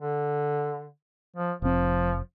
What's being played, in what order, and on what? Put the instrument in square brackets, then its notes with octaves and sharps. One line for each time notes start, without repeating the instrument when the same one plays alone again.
[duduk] D3
F3
[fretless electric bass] F1 C4 [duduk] F3